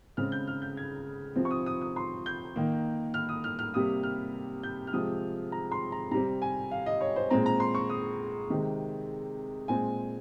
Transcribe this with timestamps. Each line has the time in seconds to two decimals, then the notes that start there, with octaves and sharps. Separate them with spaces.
0.17 C#3 G#3 C4 F6
0.32 G6
0.47 F6
0.62 G6
0.77 G#6
1.36 C3 F3 C4
1.45 C#6
1.51 D#6
1.66 D#6
1.81 D#6
1.96 C6
2.26 G6
2.56 D#3 A#3
3.14 F6
3.29 D#6
3.44 F6
3.59 F6
3.73 C3 G3 A#3 D#6
4.03 F6
4.63 G6
4.87 F6
4.93 C3 F3 G#3 D#6
5.52 A#5
5.72 C6
5.92 A#5
6.11 C3 G3 C4 A#5
6.42 G#5
6.71 F5
6.86 D#5
7.01 C#5
7.16 C5
7.30 A#2 G#3 C4 A#5
7.46 A#5
7.60 C6
7.75 C#6
7.90 D#6
8.50 C3 D#3 G#3 C4
9.68 A#2 G#3 C4 G#5